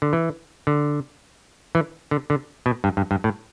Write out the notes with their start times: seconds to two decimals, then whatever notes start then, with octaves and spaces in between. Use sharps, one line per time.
0.02 D3
0.13 E3
0.67 D3
1.75 E3
2.11 D3
2.30 D3
2.66 B2
2.84 G2
2.97 G2
3.11 G2
3.24 A2